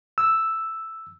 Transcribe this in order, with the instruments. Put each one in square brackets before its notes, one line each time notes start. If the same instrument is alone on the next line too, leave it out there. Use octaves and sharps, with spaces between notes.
[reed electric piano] E6